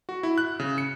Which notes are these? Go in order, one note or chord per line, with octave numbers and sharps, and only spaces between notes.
F#4
E4
F#6
C#3
C#7